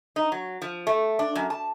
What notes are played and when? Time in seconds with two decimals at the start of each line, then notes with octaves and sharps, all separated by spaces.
0.16 D#4
0.32 F#3
0.62 F3
0.87 A3
1.19 D4
1.35 F#2
1.50 A5